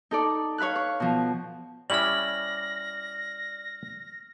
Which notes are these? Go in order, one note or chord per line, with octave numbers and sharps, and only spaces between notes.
D#4 A4 D5
C#5 F5 B5 F6 F#6
C#5
B2 F3
G3 C#4 E4 D5 F6 A#6 F#7